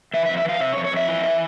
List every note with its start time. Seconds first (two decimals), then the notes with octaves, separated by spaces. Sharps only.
0.14 E3 E5
0.26 E5
0.29 F2
0.37 E5
0.45 E3 F5
0.60 C3 E5
0.73 C#5
0.77 F2
0.84 C#5
0.92 F2 E5
1.08 E3
1.24 E3